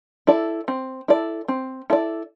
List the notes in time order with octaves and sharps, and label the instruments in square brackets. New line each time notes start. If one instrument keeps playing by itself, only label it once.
[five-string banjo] E4 A4 D5
C4
E4 A4 D5
C4
E4 A4 D5